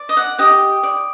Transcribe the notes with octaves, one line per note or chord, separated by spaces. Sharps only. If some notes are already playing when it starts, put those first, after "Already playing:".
Already playing: D5
D#5
F#5
G4 D#5 G5
D5